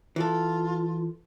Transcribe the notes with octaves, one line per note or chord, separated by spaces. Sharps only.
E3 F4 A4